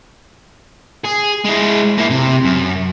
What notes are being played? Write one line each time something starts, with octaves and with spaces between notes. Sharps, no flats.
G#4
G#3 E4
A#3 E4
C3
F#2